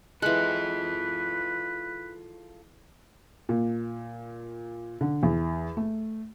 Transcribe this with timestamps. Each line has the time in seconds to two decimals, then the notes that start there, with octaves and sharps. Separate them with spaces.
0.22 E3 G#3 F4 A4 B4 F#6
3.49 A#2
5.01 D3
5.23 E2
5.77 A3